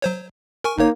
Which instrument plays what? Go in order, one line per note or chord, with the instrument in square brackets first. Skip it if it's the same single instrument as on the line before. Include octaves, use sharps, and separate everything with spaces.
[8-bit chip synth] F#3 C5 C#5
A#4 G#5 C#6
[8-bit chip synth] G1 C#5 [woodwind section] A#3 D#4